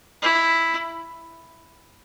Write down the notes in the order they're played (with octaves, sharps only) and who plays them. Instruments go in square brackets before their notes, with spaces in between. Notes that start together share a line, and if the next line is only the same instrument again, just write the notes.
[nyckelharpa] E4